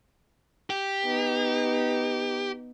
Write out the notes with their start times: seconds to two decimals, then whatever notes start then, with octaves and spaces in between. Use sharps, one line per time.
0.70 G4
1.04 B3 D#4